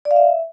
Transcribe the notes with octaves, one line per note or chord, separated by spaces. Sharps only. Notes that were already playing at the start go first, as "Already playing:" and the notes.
D5
F5
E5